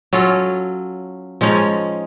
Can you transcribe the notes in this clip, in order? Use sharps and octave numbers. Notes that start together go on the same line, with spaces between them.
F#3 C#4 F4 A4
F3 G#3 C#4 D#4